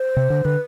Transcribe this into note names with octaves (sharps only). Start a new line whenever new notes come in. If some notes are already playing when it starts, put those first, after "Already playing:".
Already playing: C5
C3
D3
D3 B4